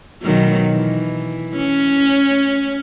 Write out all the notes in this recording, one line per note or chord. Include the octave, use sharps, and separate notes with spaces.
B2 D#3 F#3
E3
C#4